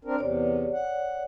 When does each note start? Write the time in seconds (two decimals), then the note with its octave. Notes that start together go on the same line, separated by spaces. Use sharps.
0.05 C4 D4 A#4
0.19 E2 C3 C#5 D5
0.73 F#5